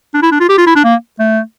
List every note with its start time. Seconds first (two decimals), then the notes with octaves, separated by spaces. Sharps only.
0.14 D4
0.22 E4
0.31 D4
0.40 F4
0.49 G4
0.58 F4
0.67 E4
0.75 D4
0.84 A#3
1.19 A3